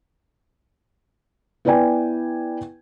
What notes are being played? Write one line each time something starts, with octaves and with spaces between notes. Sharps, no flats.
B3 E4 B4 D5 G5 G#5